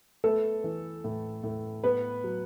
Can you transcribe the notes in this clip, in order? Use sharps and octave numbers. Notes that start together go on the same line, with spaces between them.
A3 B3 A4
E3
A2
A2
B3 B4
F#3